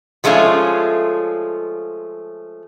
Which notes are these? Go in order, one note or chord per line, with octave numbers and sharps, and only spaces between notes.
F3 G#3 A3 C#4 F4